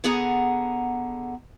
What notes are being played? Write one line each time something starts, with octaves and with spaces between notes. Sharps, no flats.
D3 B3 G#4 F#5 A#5